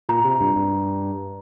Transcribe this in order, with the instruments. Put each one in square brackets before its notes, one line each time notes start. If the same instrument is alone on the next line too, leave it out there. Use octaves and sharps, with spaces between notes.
[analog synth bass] A#2 [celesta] A#5
[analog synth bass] C3
G2
G2